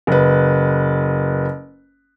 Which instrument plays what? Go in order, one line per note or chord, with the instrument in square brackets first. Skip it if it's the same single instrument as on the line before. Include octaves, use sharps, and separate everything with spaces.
[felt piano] F#1 B4